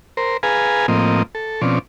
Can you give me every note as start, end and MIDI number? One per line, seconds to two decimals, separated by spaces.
0.17 0.37 70
0.17 0.37 72
0.43 0.86 68
0.43 0.86 71
0.43 0.86 77
0.43 0.86 80
0.43 0.86 82
0.88 1.23 45
0.88 1.23 53
0.88 1.23 58
0.88 1.23 60
0.88 1.23 75
1.35 1.61 69
1.62 1.79 47
1.62 1.79 53
1.62 1.79 60
1.62 1.79 61
1.62 1.79 74